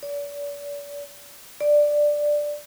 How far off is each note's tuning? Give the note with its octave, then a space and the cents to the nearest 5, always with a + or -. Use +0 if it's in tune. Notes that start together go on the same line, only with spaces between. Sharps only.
D5 -40
D5 +5